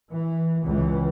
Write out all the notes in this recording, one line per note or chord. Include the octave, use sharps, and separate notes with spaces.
E3
C#2 E3